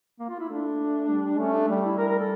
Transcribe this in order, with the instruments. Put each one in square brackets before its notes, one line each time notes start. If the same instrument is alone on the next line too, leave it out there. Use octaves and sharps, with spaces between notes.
[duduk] A#3
F4
E4
[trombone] A3 [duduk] D4
[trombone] G3
[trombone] A3 [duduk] C#4
[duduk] D4
[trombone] G3
[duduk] E4
[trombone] G3 [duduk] A#4
[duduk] A#4
A4